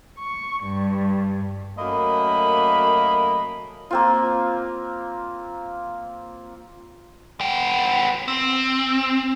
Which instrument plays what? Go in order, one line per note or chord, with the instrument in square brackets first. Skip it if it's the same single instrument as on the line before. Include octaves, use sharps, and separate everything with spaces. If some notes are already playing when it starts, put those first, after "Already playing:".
[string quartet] C#6
G2
[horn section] F#2 A3 A#3 D#5 B5
[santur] A#3 C4 F4
[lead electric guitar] B3 G5
C4